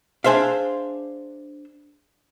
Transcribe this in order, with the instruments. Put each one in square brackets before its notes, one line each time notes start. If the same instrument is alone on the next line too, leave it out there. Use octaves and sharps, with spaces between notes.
[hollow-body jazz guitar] D4 G#4 C5 E5 F5